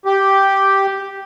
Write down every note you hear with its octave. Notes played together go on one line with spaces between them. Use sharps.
G4